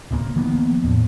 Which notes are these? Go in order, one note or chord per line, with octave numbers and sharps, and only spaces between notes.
D1 C#2 C3 A#3
D#3 F3 A#3 B3
E2 A2